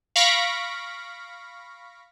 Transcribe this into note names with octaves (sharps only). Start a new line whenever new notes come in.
F5 B5 C#6 A#6 B6 D7